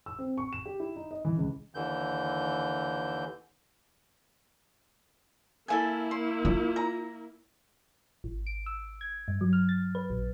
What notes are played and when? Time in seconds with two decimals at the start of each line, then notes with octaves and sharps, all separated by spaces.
0.06 E6
0.19 C4
0.38 C#6
0.53 E7
0.66 G4
0.80 E4
0.96 D#4
1.11 D#5
1.25 E3
1.37 C#2
1.75 D#2 D3 E3 G6
5.68 A#3 E4 A4 E5 G#5
6.11 C6
6.45 F4
6.76 A#5
8.24 G#1
8.47 D7
8.66 E6
9.01 G#6
9.28 G2
9.41 F#3
9.53 F6
9.69 A6
9.95 B4
10.10 A#1